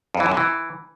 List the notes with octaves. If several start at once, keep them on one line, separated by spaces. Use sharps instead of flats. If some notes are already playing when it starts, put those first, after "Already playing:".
F2
E3
F#2
C3
E3